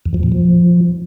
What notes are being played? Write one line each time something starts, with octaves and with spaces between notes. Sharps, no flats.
E2
F3
A#2
F3